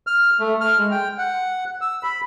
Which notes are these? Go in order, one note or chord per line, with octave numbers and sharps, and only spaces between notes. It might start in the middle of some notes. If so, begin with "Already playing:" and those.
F6
A3
F6
G#3
G5
F#5
E6
B5